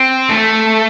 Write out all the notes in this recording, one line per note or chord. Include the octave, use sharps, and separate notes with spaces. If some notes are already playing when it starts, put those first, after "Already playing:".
Already playing: C4
A3